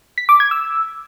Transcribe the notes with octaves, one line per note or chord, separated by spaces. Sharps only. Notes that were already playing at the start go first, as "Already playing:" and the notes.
B6
D6
G#6
E6